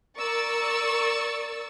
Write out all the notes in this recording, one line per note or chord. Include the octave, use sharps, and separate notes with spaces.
A#4 D5 C#6 E6 A6